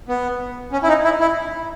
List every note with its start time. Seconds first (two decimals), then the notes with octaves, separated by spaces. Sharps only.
0.08 B3
0.72 C#4
0.83 E4
0.88 D#4
1.04 E4
1.20 E4